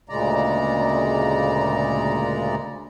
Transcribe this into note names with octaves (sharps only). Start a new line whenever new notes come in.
D2 A#2 C#3 G#3 D5 A#5